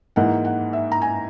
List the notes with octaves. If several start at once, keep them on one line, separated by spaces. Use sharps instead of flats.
G#2 E3 A#3 F#5
F#5
E5
A#5
G#5